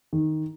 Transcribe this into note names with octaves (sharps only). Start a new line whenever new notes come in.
D#3